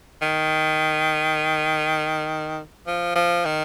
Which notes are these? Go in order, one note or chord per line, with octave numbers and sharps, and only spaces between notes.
D#3
F3
F3
D#3